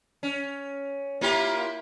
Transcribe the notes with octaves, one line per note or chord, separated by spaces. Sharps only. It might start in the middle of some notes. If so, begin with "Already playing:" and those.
C#4
A#3 E4 F4 G4